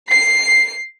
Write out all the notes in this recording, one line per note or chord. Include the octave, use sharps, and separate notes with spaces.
C7